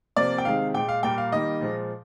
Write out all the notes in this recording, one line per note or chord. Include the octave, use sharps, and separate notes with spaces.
C3 F3 A#3 D5
G5
C3 D#3 G#3 F5
A#2 G#3 G5
F5
A#2 G3 A#3 G5
F5
D#3 G3 A#3 D#5
A#2 F3 G#3